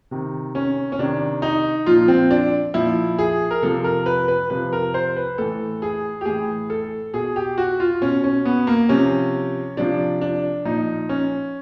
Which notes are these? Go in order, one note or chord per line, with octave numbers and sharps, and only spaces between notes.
C3 D#3
C#4
C#4
C3 D#3 D4
D#4
A#2 F3 F4
C4
D4
A#2 F3 E4
G#4
A#4
C3 F3 A4
A#4
B4
B4
C3 F3 B4
A#4
C5
B4
A2 E3 A4
G#4
G4
A2 E3 G#4
A4
B2 G#4
G4
F#4
F4
B2 C#4
C#4
B3
A#3
C3 F3 C#4
C3 F3 D4
D4
A#2 F3 D#4
C#4